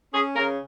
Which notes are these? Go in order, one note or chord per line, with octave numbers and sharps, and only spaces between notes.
C#4 G#4
C#3 A#4